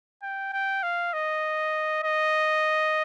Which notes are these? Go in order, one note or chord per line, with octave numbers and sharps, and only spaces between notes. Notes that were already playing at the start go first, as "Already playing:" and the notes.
G5
G5
F5
D#5
D#5